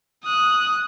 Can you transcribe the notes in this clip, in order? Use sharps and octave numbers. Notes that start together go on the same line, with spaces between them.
D#6 F#6